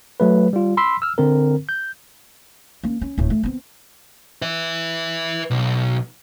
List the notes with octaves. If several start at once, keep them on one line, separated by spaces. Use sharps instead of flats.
F#3 A3 B4
G3 F4
B5 C6 E6 B6
E6 F6
D3 C4 A#4
G6
A#3 C#4
C#4
D1 A2
A3
B3 C4
B4 E5
B1